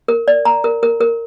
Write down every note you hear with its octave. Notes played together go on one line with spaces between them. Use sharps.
A#4
D5
A#5
A#4
A#4
A#4